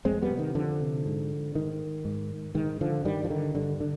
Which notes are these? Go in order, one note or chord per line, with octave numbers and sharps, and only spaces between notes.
F2 G#3 C4
G3 B3
C3
D#3
F2 D3 F3
C3
G#2
G#2 D#3
G#2
G#2 D#3
D3 F3
G2 D#3 G3
F3
D3 D#3
G2 D3
D3